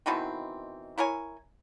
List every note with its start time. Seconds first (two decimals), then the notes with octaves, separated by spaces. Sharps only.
0.06 B2 D#3 E3 C4
0.98 E4 A#4 C#5 G#5